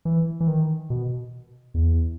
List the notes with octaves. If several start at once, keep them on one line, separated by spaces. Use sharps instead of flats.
E3
E3
D#3
B2
E2